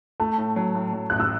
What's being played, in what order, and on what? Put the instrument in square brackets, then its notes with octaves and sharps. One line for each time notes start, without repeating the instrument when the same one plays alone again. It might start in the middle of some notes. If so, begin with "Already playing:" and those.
[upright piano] A3 [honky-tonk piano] A5
[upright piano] A2
F#3
A2
F#3
[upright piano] A1 [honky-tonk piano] F#6
[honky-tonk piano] E6